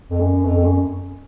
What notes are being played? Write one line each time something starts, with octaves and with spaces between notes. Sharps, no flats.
F2
F#2
F2
F2
F#2